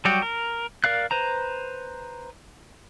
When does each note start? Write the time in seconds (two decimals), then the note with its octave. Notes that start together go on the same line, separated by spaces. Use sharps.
0.05 F#3 G3 F#4 G4
0.22 A#4
0.84 A#4 D5 F5 F#6
1.11 B4 C5 A#5